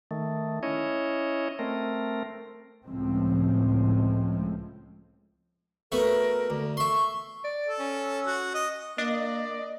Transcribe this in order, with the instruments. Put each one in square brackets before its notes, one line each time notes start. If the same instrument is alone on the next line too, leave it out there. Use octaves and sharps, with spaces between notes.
[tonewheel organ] D#3 A3
C#4 E4 C#5 D#5
A3 C4 A#4
[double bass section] C#2 A2 F3 G#3 C4
[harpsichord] A3 B3 F#4 [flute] A#4
[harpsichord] D2
[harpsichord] E5 C6 [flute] C#6
[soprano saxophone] D5
[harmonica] A4
[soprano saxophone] C#4
[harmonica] F#4
D#5
[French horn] A#3 [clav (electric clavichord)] D4 [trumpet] D5 [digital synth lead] D#5